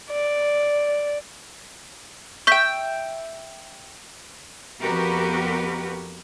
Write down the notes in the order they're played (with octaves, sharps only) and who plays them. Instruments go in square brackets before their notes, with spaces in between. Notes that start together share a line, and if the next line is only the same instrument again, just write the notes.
[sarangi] D5
[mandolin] E5 G5 [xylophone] C#6 G6 B6
[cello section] F2 B3 F#4 G4 A#4 B4